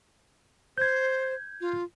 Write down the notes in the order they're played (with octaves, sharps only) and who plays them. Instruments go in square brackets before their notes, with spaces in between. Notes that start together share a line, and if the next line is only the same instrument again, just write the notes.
[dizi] C5 [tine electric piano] G6 G#6
[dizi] F4